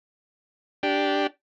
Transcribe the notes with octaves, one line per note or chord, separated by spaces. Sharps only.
D4 G4